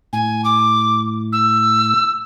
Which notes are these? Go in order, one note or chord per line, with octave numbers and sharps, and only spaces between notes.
A2 G#5
D6
E6